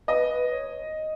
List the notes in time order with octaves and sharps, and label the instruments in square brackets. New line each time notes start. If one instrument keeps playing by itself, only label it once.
[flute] B4 [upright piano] D#5
[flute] B4
C#5